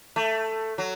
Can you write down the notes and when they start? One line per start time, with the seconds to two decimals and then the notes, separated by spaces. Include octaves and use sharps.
0.16 A3
0.78 F#3